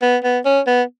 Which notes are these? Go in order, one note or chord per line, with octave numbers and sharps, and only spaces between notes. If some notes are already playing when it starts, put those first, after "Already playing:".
B3
B3
C#4
B3